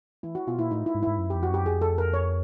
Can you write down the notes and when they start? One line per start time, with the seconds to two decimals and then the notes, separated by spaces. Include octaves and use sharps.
0.23 E3 E4
0.35 F#4
0.47 B2 F4
0.59 A#2 E4
0.71 A2 D#4
0.86 E4
0.95 G#2
1.03 E4
1.07 G#2
1.18 F#2
1.30 G4
1.34 F2
1.43 F#4
1.50 F#2 G4
1.66 F2 G#4
1.82 A4
1.98 A#4
2.14 C#5